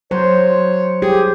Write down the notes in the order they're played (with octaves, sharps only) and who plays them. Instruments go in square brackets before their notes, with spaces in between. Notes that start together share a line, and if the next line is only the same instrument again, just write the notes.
[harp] F#3 [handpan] C5 [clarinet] C#5
[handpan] G4 [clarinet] G#4